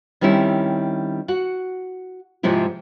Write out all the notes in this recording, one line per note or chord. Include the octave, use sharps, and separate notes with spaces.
D#3 G3 C4 C#4 E4
F#4 F#5
G#2 C3 F3 G#3 E4